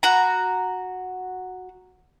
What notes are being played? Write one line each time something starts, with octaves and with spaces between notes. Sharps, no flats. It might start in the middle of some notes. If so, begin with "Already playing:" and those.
F#4 A#5